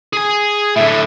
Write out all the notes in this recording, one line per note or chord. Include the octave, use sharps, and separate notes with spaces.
G#4 G#5
A2 D3 E5